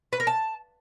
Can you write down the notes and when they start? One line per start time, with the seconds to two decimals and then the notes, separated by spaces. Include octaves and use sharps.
0.13 B4
0.20 A#4
0.27 A5